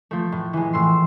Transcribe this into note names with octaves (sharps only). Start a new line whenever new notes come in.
F3 A3
A2
E3 G#3
A2 C6 E6